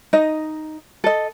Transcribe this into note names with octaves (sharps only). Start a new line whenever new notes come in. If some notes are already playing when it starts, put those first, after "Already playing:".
D#4 D#5
A4 D#5